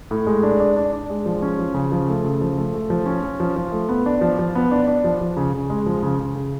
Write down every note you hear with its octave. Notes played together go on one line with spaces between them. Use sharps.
A2
G#3
D4
D4
D4
D4
G#3
F3
C#4
F3
C#3
F3
A3
C#3
F3
A3
A3
F3
C#4
C#4
F3
F3
A3
B3
D4
F3
F3
B3
D4
D4
F3
F3
C#3
C#3
G#3
F3
C#3
C#3
C#3